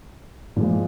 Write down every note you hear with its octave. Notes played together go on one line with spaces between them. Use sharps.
A#2 F3 G#3